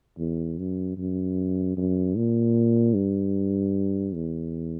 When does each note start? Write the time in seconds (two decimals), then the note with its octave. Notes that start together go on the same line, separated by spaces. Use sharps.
0.19 E2
0.59 F#2
0.98 F#2
1.77 F#2
2.17 A#2
2.95 G2
4.14 E2